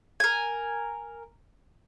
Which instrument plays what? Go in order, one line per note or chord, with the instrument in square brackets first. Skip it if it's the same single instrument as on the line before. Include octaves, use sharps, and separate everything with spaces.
[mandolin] A#4 G#5